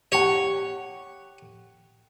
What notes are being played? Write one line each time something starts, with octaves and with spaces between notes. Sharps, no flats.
G4 C#5 F#5